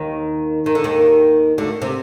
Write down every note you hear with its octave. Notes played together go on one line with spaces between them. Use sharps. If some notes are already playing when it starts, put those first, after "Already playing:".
Already playing: D#2 D#3
D#3
D3
D#2 D#3
D2 D3
C3